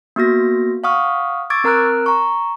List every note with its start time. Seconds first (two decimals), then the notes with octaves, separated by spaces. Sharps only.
0.16 A#3 B3 F#4 A#6
0.84 F5 F#5 C#6 D#6 F6
1.50 C#6 D6 E6 G#6 A6 D7
1.64 C4 A#4 A#5 F6 F#6 D7
2.06 A#5 C#6